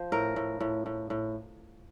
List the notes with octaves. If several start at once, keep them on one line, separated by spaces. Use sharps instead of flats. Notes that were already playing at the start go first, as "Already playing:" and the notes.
Already playing: F3 C5
A2 A#4
A2
A2
A2
A2